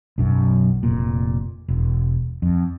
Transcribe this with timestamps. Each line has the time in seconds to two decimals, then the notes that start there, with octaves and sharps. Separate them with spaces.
0.18 B1 F#2
0.83 F1 A#2
1.68 E1
2.42 F2